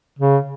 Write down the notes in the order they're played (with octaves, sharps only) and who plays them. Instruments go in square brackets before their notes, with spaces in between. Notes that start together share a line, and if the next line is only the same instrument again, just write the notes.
[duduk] C#3